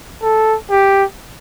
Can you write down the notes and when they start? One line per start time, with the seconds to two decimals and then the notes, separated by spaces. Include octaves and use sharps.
0.22 A4
0.71 G4